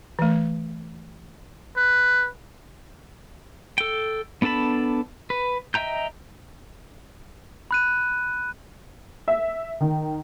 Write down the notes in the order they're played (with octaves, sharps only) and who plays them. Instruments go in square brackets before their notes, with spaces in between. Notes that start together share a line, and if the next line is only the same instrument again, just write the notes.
[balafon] E3 A3
[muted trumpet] B4
[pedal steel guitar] A4 G5
B3 D4 A4 A5 B5
B4
D#5 E5 G5 A#5 G6
[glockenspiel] B5 F#6 D#7
[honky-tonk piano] E5
D#3